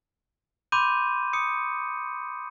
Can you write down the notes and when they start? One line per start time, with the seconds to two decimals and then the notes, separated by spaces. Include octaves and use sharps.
0.72 B5 C6 D6 G6 D#7
1.33 D#6 C#7